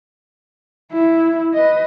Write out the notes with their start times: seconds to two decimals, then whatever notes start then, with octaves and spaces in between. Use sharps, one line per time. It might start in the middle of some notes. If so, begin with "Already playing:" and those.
0.92 E4
1.54 B4 D#5